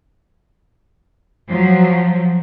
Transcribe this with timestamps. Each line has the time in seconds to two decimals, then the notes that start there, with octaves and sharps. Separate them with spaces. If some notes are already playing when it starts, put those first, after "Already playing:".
1.50 F3 F#3